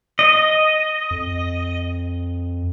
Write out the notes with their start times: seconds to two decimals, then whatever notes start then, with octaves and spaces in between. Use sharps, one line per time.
0.19 D#5
1.11 F2